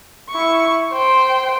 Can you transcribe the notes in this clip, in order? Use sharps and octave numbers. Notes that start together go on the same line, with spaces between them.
E4 C#6
C5 G5